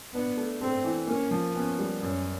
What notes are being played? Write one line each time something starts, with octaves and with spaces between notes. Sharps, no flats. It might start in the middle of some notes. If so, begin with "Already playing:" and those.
B3 D4
A3
A3 C4
E3
A#3 C#4
F3
B3 C#4
G3
F#2 C#4